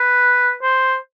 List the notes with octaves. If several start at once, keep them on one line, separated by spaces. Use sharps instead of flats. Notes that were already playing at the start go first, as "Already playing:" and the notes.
Already playing: B4
C5